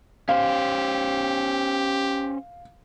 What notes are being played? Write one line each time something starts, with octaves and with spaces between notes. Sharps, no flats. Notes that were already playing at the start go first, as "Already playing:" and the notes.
C#4 G4 C5 F5